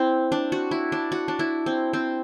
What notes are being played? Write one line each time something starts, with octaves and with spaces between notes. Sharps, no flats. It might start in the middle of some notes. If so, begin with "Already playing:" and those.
Already playing: C4 E4
D4
F#4
E4
D4
F#4
D4
E4
C4
C4